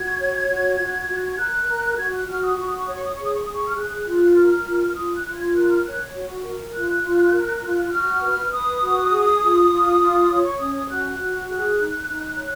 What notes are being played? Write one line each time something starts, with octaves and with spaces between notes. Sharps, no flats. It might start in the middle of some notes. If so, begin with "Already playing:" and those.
Already playing: F#4 G#6
C#5
F#4
F#4
F#4
A#4 F#6
A#4
F#4 G#6
F#6
F#4 F6
D#6
F#4 C#6
D#6
C#6
C#5 D#6
C#6
D#6
G#4 C#6
D#6
C#6
G#4 D#6
C#6
F6
G#4 F#6
F4
F#6
A#4 F6
F4
F6
F4 D#6
F#6
F4
G#6
A#4 F#6
F6
C#5 F#6
F#4
A#4
F4 F#6
F4
A#4
F4
F#4 F6
B4
B4 D#6
F#4
G#4
F4
F4
F4
C#5
C#6
C#4 D#6
D#6
F#4 F#6
F#4
G#4 F#6
D#4
D#4
C#5